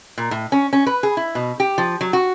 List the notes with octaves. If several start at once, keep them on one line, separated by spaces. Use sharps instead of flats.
A#2
A2
C#4
C#4
B4
G#4
E4
B2
G4
F3
F#3
F#4